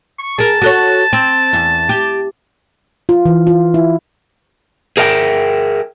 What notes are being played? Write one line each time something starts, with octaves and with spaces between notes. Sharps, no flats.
C#6
G#4 A#4 A5
F#4 A4 C#5
C4
E2
G4
F4
E3
F4
E4
G#4 A#4 E5 F#5 G5